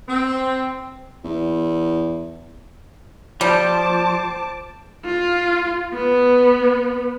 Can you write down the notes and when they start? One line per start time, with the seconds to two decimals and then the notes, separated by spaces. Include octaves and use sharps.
0.08 C4
1.24 E2
3.41 F3 G3 C5 A5 D6
5.05 F4
5.94 B3